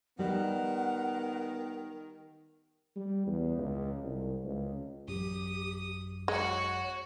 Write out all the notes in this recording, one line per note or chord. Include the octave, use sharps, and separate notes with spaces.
D#3 G3 B3 F#5
G3
E2
C#2
C2
C#2
A1 F#2 G4 D#6
G#3 F#4 C#5 F#5